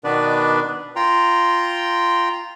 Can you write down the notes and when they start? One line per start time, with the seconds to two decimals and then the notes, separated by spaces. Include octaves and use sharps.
0.04 B2 D#3 B3 D4 B4 D5
0.96 F4 G5 A#5 C6